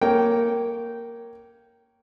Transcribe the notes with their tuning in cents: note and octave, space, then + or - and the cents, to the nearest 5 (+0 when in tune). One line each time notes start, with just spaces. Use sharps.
A#3 +0 C#5 +0 G5 -15